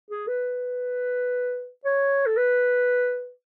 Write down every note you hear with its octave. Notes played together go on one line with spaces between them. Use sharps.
G#4
B4
C#5
A4
B4